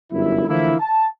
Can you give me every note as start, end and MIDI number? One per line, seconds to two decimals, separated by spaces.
0.11 0.46 31
0.11 0.46 42
0.11 0.46 64
0.47 0.74 50
0.47 0.74 52
0.47 0.74 53
0.47 0.74 57
0.47 0.74 58
0.47 0.74 64
0.80 1.04 81